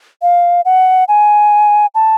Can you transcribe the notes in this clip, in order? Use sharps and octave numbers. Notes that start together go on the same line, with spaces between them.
F5
F#5
G#5
A5